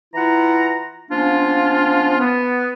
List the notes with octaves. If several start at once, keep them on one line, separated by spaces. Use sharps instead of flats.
E3 E4 F4 F#5 A#5
F3 A#3 B3 C#4 D4 F4
B3